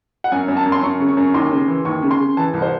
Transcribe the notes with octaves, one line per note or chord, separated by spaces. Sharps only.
F#5
F#2 G#5
F#2
A5
F#2
C6
F#2 C#6
C#3
C#6
F#2
D#2 C6
C#3
E3
D#2 C#6
C#3
C6
C#3
E3 A5
C2
C5